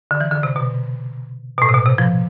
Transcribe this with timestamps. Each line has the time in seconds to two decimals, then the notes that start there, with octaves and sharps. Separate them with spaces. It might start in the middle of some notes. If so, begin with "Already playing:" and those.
0.11 D3
0.20 E3
0.32 D3
0.43 C3
0.56 B2
1.58 B2
1.62 A2
1.69 C3
1.74 B2
1.86 C3
1.98 F3